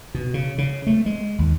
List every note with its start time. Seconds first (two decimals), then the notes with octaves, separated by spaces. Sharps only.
0.14 B2
0.34 C#3
0.58 C#3
0.87 A3
1.06 G#3
1.38 D#2